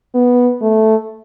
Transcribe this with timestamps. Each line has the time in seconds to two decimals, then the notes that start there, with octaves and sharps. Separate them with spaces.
0.14 B3
0.62 A3